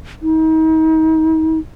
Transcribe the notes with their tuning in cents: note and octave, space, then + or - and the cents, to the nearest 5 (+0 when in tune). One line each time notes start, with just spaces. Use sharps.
D#4 +35